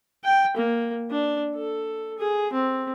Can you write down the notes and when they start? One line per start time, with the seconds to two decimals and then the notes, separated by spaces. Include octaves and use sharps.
0.24 G5
0.57 A#3
1.10 D4
1.56 A4
2.18 G#4
2.53 C4